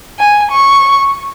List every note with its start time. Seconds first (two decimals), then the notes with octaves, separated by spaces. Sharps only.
0.19 G#5
0.51 C#6